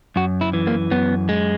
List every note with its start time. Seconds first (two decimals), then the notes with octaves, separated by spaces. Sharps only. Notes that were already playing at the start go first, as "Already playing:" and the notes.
0.16 F#2 F#4
0.41 E4
0.53 E3
0.67 A#3
0.91 F#2 B3
1.29 G#3